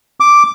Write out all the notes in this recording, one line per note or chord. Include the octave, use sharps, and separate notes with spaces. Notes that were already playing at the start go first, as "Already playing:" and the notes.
D6